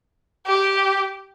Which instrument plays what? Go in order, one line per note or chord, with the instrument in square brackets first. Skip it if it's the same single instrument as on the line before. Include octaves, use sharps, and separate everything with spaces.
[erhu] G4